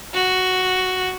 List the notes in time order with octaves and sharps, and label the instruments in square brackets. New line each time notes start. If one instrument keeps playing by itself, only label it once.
[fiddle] F#4